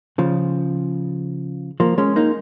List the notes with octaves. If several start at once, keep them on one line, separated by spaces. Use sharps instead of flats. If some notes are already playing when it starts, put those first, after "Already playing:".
C#3 F3
F3 A#3
G#3 C#4
A#3 D#4